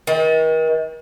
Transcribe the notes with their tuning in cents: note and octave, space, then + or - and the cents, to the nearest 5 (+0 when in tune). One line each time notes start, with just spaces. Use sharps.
D#3 +40